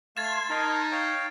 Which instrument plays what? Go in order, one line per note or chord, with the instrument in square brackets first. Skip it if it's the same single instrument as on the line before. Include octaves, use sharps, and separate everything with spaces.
[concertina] A3 F5 F6 [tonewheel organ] C6 G#6 [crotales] A6 E7
[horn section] D#4 [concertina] A#4 A5
[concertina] C#5 F5 G5